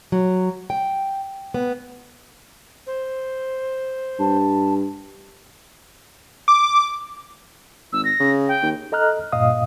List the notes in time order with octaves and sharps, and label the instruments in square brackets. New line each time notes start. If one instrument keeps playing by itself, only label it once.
[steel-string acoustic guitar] F#3
G5
B3
[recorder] C5
[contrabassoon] G2 [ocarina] A5
[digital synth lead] D6
[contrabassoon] G#1 [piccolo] E6
[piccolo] A#6
[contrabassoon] C#3
[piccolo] G5
[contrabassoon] D#2
[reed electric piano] A4 D#5 A#5 F6 F#6
G2 A#2 D#5 F5 D#6